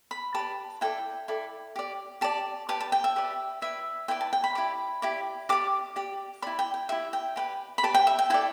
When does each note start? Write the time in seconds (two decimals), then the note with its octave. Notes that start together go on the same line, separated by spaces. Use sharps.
0.11 B5
0.34 G4 B4 D5 A5
0.81 E4 A4 D5 G5
1.28 E4 A4 D5
1.76 G4 D5
2.21 G4 D5 A5
2.69 G4 B4 D5 A5
2.81 A5
2.92 G5
3.04 E5
3.16 G4 B4 D5
3.61 E4 B4 D5 E5
4.08 E4 B4 D5 G5
4.21 A5
4.33 G5
4.44 B5
4.55 E4 G4 D5
5.02 E4 G4 D5
5.49 G4 D5 D6
5.96 G4 D5
6.42 E4 G4 D5 B5
6.59 G5
6.74 G5
6.89 E4 G4 D5 E5
7.13 G5
7.36 G4 B4 D5 G5
7.78 B5
7.83 G4 B4 D5 A5
7.94 G5
8.07 E5
8.19 G5
8.30 E4 A4 D5 G5